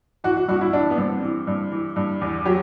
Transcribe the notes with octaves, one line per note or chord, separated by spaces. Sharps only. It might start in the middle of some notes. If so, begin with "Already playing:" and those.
E3 F#4
F#4
G2 F#4
E4
E3 D4
B3
G2 C4
E3
G2
E3
G2
E2
F#3 G4